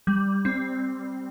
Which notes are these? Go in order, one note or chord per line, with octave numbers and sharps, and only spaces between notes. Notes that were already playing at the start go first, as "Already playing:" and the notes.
G3
C4